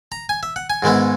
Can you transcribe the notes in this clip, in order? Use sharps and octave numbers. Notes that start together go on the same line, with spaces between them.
A#5
G#5
E5
F#5
G#5
G#2 D#3 G#3 B3 E4